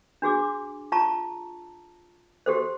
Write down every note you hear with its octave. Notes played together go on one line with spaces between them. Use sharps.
D4 F#4 G#4 D6
F4 A5 A#5 C#6
F#4 G4 A4 C5